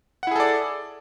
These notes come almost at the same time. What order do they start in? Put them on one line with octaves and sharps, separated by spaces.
F#5 E4 G#4 A4 D5